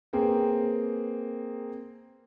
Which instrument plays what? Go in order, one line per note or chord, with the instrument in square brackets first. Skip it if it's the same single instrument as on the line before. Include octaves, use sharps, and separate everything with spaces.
[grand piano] A#3 C4 G#4 B4 G5